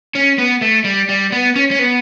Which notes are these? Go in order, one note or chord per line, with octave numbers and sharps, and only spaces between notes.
C#4
B3
A3
G3
G3
B3
C#4
C#4
B3